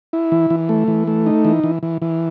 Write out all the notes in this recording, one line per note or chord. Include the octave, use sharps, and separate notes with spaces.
E4
E3
E3
A3
E3
A3
D#4
E3
E3
E3
E3